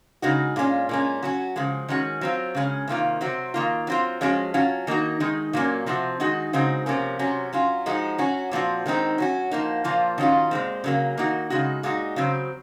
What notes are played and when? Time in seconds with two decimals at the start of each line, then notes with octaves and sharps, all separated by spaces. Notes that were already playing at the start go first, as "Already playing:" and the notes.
0.22 C#3 G#3 D#4 F#4
0.56 A#2 G#3 C#4 F4
0.89 A#2 G#3 C#4
1.22 F#3 C#4 F#4
1.56 C#3 F3 G#3
1.88 D#3 G#3 C#4 F#4
2.21 F#3 C4 F4
2.55 C#3 G#3 C#4
2.88 C3 D#3 A#3 F4
3.21 C3 F#3 C4 F#4
3.54 D#3 A#3 F4
3.87 F#3 C4 F4
4.21 F3 G#3 C#4 F#4
4.54 F#3 C#4 F4
4.87 D#3 A#3 D#4 F#4
5.20 D#3 G#3 D#4
5.53 A#2 F#3 A#3 C#4
5.86 C3 F3 C4 F#4
6.20 D#3 G#3 D#4 F#4
6.53 C#3 G#3 C4 D#4 F#4
6.86 C3 F3 A#3 C#4
7.19 C3 F#3 C#4
7.53 F#3 C#4 F4
7.86 F3 G#3 D#4 F#4
8.18 F#3 C#4 F#4
8.51 A#2 F3 C4 F#4
8.86 D#3 G#3 C4 D#4
9.18 F#3 C#4 F#4
9.51 F3 A#3 D#4
9.84 A#2 F3 A#3 F4
10.18 D#3 F#3 C#4 F4
10.51 A#2 G#3 C4
10.84 C#3 F#3 A#3
11.17 D#3 A#3 D#4 F#4
11.50 C#3 G#3 D#4 F#4
11.83 A#2 G#3 D#4 F#4
12.16 C#3 F#3 C4